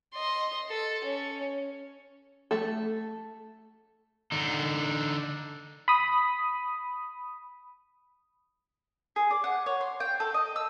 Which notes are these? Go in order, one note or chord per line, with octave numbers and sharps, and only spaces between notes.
D#5 C6
A4
C#4
A3 A4
D3 D#4
B5 D#6
G#4
D5
F#5
C#5
C6
G5
A4
D#5
E6